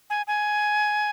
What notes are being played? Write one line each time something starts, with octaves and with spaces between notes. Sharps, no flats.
G#5
G#5